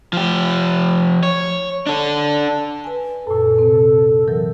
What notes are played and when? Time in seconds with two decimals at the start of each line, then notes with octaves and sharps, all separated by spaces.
0.13 F3 G4
1.23 C#5
1.87 D4 A4
2.84 B4 G#5
3.27 F#2 A#2 A4
3.59 C3 C4
4.28 E3 F#3 A#4